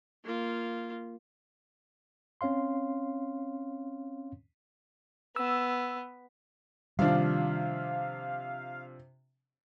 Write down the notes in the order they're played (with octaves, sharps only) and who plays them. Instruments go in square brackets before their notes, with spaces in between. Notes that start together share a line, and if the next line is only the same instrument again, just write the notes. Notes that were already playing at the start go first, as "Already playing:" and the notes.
[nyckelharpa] A#3 F4
[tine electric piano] C4 C#4 C#5 F5 C6
[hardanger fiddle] B3 [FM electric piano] E6
[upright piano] C3 F3 D4 [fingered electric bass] D#3 G3 [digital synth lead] F5